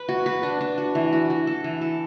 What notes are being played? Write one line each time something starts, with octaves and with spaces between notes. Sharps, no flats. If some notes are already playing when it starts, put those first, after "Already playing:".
Already playing: B4
F#4
B4
D4
D4
F#4
E3
F#4
F#4
A4
E3
A4